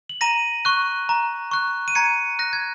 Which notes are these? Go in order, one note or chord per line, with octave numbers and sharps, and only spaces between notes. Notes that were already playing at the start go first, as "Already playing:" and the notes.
F#7
A#5 A#6 D#7
C#6 F#6
A#5
C#6 F#6
D#7
A#5 G#6 C#7
F#6 A#6
G#6